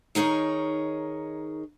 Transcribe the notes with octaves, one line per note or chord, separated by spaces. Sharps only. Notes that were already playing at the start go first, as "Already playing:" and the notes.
D#3 D#4 G#4 A#4 C#5